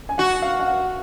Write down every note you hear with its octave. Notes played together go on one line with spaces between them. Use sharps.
G#5
F#4 F#5
F5
F5
F#5